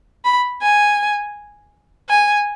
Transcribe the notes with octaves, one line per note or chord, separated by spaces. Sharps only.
B5
G#5
G#5